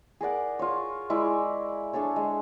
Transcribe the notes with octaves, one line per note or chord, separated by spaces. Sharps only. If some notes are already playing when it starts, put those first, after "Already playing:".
G#4 A#4 D5 F#5
F4 C#5
G#3 E4 D5 C#6
D4 G#4 A4 C#5
G#3